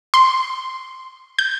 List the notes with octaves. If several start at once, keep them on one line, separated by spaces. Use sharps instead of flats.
C6
G6